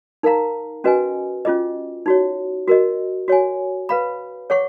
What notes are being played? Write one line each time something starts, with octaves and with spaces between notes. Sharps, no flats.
D#4 A#4 F5 A#5
C#4 F#4 B4 D#5 G#5
C#4 F4 G#4 D#5
D#4 F#4 C#5
F#4 A#4 D#5
F#4 C#5 G#5
B4 F5 B5
G#4 C#5 F#5 C#6